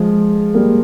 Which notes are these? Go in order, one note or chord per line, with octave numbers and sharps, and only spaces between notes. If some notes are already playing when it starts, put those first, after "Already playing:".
Already playing: F3 G#3
G3 A#3